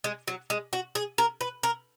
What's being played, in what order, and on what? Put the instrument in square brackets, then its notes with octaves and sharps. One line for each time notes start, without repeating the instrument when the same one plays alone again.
[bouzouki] G#3
F#3
G#3
F#4
G#4
A#4
B4
A#4